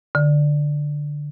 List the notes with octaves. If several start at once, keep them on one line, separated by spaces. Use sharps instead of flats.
D3